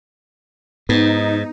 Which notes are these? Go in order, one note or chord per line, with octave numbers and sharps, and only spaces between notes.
G#2 B3 D#4